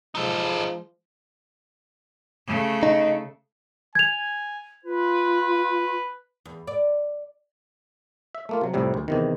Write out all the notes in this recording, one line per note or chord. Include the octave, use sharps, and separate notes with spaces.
F3 G#3 D#4 A4
C#3 A3
D#4
G#5 G#6 F7
F4 B4
E2
D5
E5
A3 A#3 F4
C3 F#3
C2 F2 A2 C3 G3
D2
E2 C3 D#3